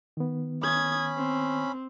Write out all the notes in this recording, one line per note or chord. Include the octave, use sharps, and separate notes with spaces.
D#3 B3
C#4 B5 D#6 G#6
C4